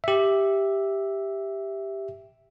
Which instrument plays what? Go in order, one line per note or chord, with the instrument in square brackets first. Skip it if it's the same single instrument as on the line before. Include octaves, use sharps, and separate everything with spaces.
[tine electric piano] G4 E5